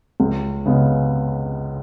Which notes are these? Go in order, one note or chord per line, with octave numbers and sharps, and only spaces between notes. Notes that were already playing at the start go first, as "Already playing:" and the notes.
C#2
C#3 G#3 B3